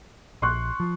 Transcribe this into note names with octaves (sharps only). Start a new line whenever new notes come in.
A#1 C6 C#6 F#6
F3